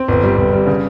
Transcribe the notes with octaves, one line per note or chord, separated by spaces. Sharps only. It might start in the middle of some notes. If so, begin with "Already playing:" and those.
Already playing: C4
G1
G3
G1
G3
C#3